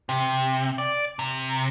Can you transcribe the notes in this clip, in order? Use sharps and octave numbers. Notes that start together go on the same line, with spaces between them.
C3
D5
C3